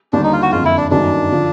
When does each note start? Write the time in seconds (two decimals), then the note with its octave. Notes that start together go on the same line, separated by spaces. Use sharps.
0.13 D#2 D3 G3 D4
0.24 D#4
0.33 F4
0.42 F#4
0.52 F#1 F2 D3 F4
0.65 E4
0.77 D4
0.91 G1 F#2 D#3 F#3 D4
1.31 D3 F3